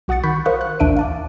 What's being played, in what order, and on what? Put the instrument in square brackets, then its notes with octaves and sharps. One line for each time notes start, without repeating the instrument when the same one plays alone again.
[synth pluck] B1 F#4 F#5 D#6 A6 C#7
D#3 B5 C#6 F#6 G6 B6
A#4 C5 F5 C#6 D#6 F#6
F#6
A1 D#2 D4 E5 D7 D#7
F5 A5 D6